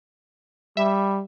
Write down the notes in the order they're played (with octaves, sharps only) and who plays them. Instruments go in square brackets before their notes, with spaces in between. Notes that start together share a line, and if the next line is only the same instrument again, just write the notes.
[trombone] G3 [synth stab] E5